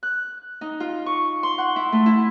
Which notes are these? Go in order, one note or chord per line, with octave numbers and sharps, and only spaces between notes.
F#6
D#4
F4
C#6
C6
F#5
E4
A3
E4